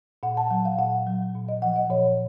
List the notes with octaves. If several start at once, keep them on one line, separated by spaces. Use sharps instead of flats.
A#2 F#5
A5
F#3 F#5
F5
A#2 F#5
F#3
A#2
D#5
F3 F#5
D#5
A#2 C#5